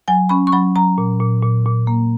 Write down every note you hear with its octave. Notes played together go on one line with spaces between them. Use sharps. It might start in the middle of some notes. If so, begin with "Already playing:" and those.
F#3 G#5
C#4 B5
C#6
F#3 B5
F#3 A#5
A#2
A#2
A#2
A#2
A#3